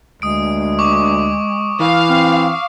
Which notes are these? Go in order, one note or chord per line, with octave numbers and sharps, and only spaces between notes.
D2 G#3 D#6 D7
C#6 D6
E3 F5
C4